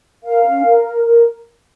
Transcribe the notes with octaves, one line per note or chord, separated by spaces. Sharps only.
A#4 F5
C#4
A#4
A#4
A#4